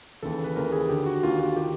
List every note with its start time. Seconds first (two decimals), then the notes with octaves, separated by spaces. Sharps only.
0.23 D#2 C#3 E3 A4
0.44 B4
0.56 D#2 C#3 E3 A#4
0.72 G#4
0.89 D#2 D3 G4
1.06 F#4
1.23 D#2 D3 F4
1.40 F4
1.56 D#3 G4